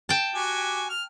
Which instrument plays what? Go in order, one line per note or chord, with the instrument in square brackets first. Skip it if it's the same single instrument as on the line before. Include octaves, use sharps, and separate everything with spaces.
[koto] G5 A5
[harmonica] F#4 G4 G#5
F6